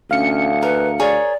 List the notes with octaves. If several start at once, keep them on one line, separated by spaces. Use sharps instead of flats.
D2 C#4 F5 C#7
A#4 B4
G#4 A#4 C#5 D5